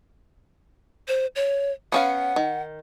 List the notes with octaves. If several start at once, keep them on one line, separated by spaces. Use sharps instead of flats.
C5
C#5
B3 C#4 F5 F#5
D#3